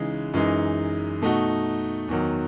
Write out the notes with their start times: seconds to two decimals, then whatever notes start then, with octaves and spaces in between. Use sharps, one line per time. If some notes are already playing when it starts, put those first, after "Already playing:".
Already playing: C#3 E3 G#3 D#4
0.34 F#2 E3 G#3 D#4
1.22 B2 A3 D#4 F#4
2.09 E2 D#3 F#3